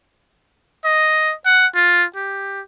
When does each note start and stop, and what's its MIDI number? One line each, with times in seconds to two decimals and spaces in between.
0.85 1.34 75
1.46 1.67 78
1.75 2.04 65
2.16 2.61 67